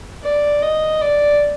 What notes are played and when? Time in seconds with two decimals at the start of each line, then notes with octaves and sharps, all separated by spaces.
0.23 D5
0.62 D#5
1.01 D5